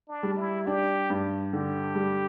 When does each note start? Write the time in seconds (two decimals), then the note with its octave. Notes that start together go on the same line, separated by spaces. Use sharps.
0.09 D4
0.23 G3
0.37 E4
0.66 D4 G4
1.10 G2
1.53 D3 G4
1.95 G3